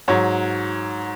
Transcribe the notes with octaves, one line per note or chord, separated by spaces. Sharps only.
G#2 F#3 C#5